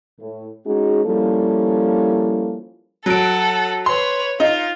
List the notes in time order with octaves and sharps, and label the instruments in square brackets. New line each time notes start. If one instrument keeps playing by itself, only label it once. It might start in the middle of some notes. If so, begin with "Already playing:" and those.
[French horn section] A2
G#3 C#4 D#4 F#4 G#4
F3 G3 A#3 C#4 E4 A4
[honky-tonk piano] F#3 D7 [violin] A4 F#5
[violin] B4 C#5 [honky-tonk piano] C6
[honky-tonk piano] D#4 [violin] F4